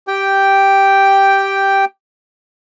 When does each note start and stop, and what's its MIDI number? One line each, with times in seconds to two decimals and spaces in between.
0.08 1.85 67
0.08 1.85 79